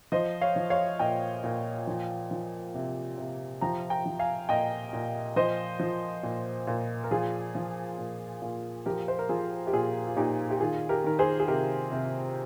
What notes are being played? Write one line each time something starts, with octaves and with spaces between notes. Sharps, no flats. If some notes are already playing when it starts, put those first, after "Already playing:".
F3 C5 D#5
C#5 F5
F3
C#5 F5
A#2 D#5 G5
A#2
F3
F3
C3
C3
F3 G5 A#5
G5 A#5
F3
F5 G#5
A#2 D#5 G5
A#2
F3 C5 D#5
F3
A#2
A#2
A#4
F3 F4 G#4
F3
A#2
A#2
F3 G4 A#4
C5
A#4
F3 F4 G#4
G4
A#2 F4 G#4
F4
A#2 D#4 G4
G4
D#3 F4 G#4
G4 A#4
D#3 A#4
G#4 C5
G#4
C3 G4 A#4
C3